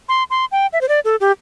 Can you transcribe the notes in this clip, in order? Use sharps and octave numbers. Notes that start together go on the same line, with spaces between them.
C6
C6
G5
E5
C5
D5
A4
G4